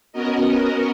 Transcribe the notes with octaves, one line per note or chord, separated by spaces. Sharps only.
B3 C#4 F#4 A#4 D#5